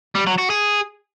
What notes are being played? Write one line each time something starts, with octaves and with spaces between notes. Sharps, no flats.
G3
F#3
F#4
G#4